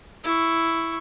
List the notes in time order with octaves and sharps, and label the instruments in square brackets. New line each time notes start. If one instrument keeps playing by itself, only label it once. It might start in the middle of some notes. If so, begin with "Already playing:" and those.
[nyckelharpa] E4 C#6